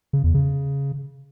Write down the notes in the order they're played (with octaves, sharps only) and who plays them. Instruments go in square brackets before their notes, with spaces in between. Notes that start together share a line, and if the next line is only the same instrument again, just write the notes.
[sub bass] C#3
E2
C#3